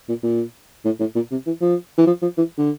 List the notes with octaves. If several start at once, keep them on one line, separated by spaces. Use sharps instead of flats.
A#2
A#2
A2
A2
A#2
C3
E3
F3
E3
F3
F3
E3
D3